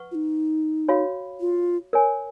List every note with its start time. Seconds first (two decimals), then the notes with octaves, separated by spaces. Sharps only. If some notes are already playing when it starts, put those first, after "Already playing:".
Already playing: B4 F#5 C#6
0.11 F4
0.15 D#4
0.88 F#4 C#5 F5 B5
1.41 F4
1.93 A#4 C#5 G#5